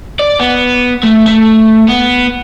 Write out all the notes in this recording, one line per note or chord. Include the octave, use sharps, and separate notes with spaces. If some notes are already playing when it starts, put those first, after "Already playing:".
D5
B3
A3
A3
B3